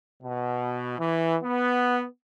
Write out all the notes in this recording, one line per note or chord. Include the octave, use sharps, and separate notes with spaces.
B2
E3
B3